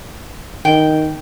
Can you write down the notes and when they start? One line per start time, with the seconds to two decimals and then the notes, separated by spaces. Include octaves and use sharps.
0.65 D#3 G5